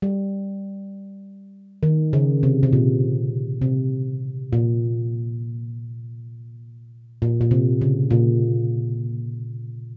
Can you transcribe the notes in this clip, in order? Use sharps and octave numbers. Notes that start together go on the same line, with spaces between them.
G3
D#3
C#3
C3
C3
A#2
C3
A#2
A#2
A#2
C3
C#3
A#2